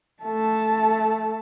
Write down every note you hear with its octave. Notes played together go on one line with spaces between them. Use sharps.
A3 A5